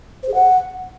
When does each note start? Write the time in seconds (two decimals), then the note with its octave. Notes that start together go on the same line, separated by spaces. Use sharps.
0.23 C5
0.28 G#4
0.34 F#5